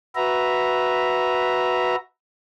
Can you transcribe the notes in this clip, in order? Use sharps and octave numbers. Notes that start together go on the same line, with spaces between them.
F#4 B4 E5 A#5